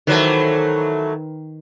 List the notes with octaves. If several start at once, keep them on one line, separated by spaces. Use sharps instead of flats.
D#3 E3 F#3 A3 B4 C5